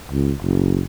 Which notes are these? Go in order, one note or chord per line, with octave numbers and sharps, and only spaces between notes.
C#2
F#1